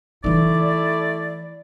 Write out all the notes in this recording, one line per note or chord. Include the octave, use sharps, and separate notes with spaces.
E3 A3 D#4 E4 D5